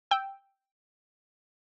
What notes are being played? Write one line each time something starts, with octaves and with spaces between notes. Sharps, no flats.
G5 E6